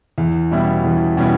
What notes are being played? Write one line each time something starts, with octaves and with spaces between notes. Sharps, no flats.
E2
B2 G3 C#4 E4
E2
B2 G3 C#4 E4